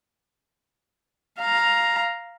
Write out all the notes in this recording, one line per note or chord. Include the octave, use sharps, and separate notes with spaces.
F5 A#5